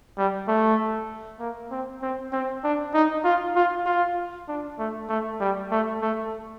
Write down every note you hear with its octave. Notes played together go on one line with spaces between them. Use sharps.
G3
A3
A#3
C4
C4
C4
D4
D#4
F4
F4
F4
D4
A3
A3
G3
A3
A3